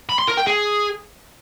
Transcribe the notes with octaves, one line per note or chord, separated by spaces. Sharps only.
B5
C6
A#4
G5
G#4